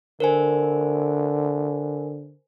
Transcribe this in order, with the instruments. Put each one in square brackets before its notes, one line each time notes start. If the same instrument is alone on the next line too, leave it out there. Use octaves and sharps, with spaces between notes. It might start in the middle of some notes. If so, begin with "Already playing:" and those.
[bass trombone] D3 [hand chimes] A#4 C5 G#5